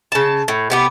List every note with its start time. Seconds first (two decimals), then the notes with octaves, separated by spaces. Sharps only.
0.12 C#3 A5
0.48 A2
0.70 C3 B3 G4